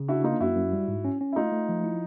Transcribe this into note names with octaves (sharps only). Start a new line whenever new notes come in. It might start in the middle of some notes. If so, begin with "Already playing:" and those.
Already playing: C#3
D4 E4 F#4
A#3 D#4 F4
F#2 E4 F#4
F#2
G3
G#2
C#4
C#4
E4
A3 D#4 F4
A3
F3
E4